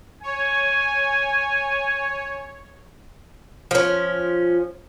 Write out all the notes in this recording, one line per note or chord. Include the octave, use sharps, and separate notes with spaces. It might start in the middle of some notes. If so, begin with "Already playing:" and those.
C#5 G#5
F3 C#4